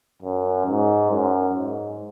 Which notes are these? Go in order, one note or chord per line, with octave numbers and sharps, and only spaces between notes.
F#2
G#2
F#2
G#2